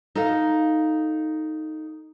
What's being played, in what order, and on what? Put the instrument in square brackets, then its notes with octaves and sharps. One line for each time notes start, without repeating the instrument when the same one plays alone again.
[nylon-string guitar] D#4 A4 D#5 F5